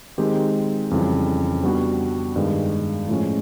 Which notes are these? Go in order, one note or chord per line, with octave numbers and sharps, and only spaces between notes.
D#3 G#3 C4 D#4 G4
F2 C#3 E3 G3
G3 B3 D4 F#4
G2 D#3 G#3
A2 F3 G#3 C#4